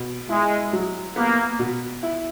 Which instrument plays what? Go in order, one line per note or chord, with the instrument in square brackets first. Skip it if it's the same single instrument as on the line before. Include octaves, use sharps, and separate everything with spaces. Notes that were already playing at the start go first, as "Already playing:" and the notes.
Already playing: [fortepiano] B2
[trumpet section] G#3 [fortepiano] E4
[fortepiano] F#3
[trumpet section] A#3 [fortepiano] B3
[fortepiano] B2
E4